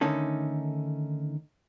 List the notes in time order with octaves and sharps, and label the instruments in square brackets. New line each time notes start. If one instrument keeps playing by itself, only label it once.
[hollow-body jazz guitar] D3 D#3 A3 C#4 D#4 A4